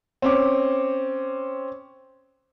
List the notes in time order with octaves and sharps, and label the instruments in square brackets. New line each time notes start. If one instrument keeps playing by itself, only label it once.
[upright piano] C4 C#4 D6